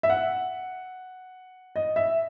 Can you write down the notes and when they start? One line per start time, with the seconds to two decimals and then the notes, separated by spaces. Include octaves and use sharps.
0.03 E5
0.10 F#5
1.76 D#5
1.96 E5